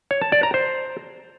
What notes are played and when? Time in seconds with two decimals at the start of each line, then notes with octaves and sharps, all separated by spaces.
0.11 C#5
0.21 A5
0.32 D5
0.43 A#5
0.54 C5